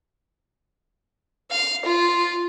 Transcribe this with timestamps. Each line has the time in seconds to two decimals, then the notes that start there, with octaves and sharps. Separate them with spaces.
1.51 F5
1.85 F4